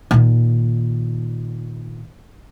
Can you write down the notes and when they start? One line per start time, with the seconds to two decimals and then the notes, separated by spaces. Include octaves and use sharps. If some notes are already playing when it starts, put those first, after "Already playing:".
0.11 A#2 D#3